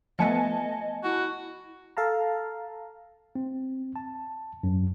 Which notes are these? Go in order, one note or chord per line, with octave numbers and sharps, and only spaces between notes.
F3 A3 B3 D#5 G#5 A5 C#7
E4 F#4
A4 F5 A5 A#5
C4
A5
F#2